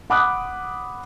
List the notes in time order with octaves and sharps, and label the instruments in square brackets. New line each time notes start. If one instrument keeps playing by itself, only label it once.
[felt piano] F#5 B5 D6 D#6 F#6